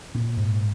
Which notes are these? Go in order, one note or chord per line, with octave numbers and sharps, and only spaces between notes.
A#2
G#2